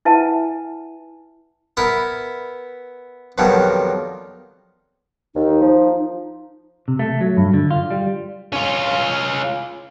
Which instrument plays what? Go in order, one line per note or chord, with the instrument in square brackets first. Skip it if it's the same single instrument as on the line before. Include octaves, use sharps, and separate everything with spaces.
[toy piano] E4 B4 E5 F#5 G#5 A5
[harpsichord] B3 E4 A#4 B4
F2 B2 D#3 F#3 G3
[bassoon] D#2 [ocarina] D#4
[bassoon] F3
[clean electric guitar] C3
A3
F#3
G2
D3
F4
G3
[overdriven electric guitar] C#4 F4